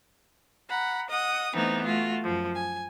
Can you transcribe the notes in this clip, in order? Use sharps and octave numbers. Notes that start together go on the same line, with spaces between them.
F#5 A#5 B5
D#5 F#5 D#6
E3 A3 B3 C4 D#4
A3 F4 F#4
F#2 F3
G#5